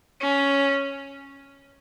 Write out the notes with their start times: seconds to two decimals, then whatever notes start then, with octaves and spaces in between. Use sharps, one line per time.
0.21 C#4